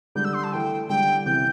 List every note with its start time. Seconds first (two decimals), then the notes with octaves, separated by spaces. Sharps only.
0.15 D3 G3 G6
0.25 E6
0.34 C6
0.44 A5
0.53 E3 A3 G5
0.89 D3 G3 G5
1.26 C3 E3 G6